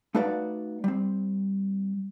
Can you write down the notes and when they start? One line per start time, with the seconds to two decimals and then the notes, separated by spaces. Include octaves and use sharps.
0.15 A3 D#4 F#4 B4 D5 F5
0.84 G3 C4